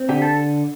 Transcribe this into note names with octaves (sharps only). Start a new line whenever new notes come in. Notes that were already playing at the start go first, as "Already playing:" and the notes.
Already playing: C4
D3 G4
A4